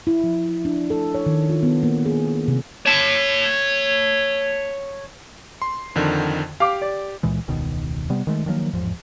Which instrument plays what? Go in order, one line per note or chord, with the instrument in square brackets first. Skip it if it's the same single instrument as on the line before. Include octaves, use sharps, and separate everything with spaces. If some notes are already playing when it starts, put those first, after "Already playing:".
[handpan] E4
F3
D4
A4
C#5
D#3
F4
B3
A#3
G#4
C3
[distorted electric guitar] C#5 A5
[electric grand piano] C6
F2 D3 D#3
[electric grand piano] G4 [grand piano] F5 D6
[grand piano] D5
[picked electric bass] C#2 A#2 E3 G#3
E1 C#2 B2 D#3
C3 G3 B3
D#3 G#3 A3
D#3 F3 F#3 A#3
A1 E2 G#2 F3